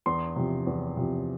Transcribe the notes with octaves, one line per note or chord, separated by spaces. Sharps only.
E2 C6
C3 F3
E2
C3 F3